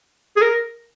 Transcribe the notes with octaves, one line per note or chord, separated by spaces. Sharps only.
G#4
A#4